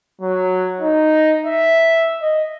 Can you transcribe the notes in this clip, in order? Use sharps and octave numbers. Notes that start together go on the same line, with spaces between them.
F#3
D#4
E5
D#5